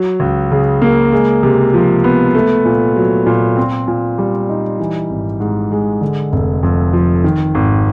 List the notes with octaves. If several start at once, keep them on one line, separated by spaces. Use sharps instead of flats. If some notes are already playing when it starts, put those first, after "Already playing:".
Already playing: F#3
C#2
C#3
A#3
G#3
C3
F3
B3
A3
A#2
F#3
A#2
C4
A#2
G3
D#4
E3
G#1
G#2
G#3
D3
F1
F2
F3
D#3
G#1